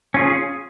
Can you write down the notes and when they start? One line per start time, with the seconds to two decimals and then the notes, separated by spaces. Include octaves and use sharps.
0.14 C#4 F4 G#4